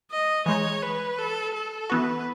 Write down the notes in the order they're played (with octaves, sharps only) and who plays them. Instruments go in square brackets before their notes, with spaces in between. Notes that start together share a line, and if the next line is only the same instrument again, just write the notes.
[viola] D#5
[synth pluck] E3 G#3 D#4 [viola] C#5
[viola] B4
A4
A4
[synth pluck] E3 B3 F#4 [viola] B4